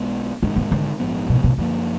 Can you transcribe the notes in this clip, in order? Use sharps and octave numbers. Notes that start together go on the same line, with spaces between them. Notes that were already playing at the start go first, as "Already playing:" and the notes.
Already playing: B1 B2 G#3
A#1 G#2 D#3 D4
B3
D3
A#1 G#2 F3 B3
B2
B2
F#1 F#2 D3 F3 A#3